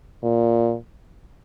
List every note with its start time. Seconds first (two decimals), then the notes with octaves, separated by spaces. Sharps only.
0.23 A#2